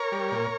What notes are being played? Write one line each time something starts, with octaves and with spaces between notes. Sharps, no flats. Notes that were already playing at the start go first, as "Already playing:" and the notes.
Already playing: A#4 C#5
G3
A#2